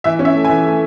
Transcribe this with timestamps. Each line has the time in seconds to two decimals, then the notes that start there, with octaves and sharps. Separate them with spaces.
0.04 E3 E5
0.19 C#4
0.25 E5
0.35 A3
0.44 G#5
0.50 E3
0.66 A3